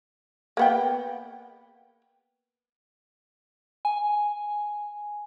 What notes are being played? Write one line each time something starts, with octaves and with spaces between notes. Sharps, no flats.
A#3 B3 G5
G#5